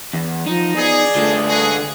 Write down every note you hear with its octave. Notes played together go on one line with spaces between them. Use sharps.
E2
F3 D#4
B3 G#4 D5
D3 A3 F4
F#4 G#4